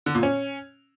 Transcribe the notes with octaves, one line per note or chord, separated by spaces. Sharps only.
D3
A#2
C#4